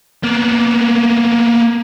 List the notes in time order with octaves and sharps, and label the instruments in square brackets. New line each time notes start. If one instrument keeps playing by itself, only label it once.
[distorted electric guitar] A#3 B3